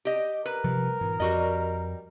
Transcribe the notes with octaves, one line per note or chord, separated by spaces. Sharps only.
G4 D#5
A#4 B4
C3 F3 G3
G#2 B2 E3
F2 G3 F#4 D#5